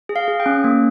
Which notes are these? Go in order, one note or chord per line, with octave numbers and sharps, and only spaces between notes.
G#4
F5
G#4
G5
C#4
A#3